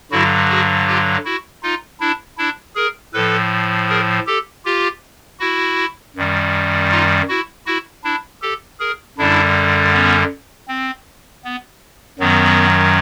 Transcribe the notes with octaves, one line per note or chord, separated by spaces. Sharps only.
G2 D3 F#3 E4 F#4
F#4 G#4
F4 G4
E4 F#4
D#4 F4
D4 E4
D4 E4
G#4 A#4
A2 F3 A4 B4
G#4 A#4
G4 A4
F4 G4
E4 F#4
F#2 D#3 G3
D#4 F4
E4 F#4
E4 F#4
D4 E4
G4 A4
G#4 A#4
F#2 D3 G3 D4 E4
B3 C#4
C4
B3
F#2 D#3 F#3 B3